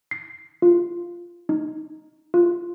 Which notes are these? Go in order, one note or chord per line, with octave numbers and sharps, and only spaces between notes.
C7
F4
D#4
F4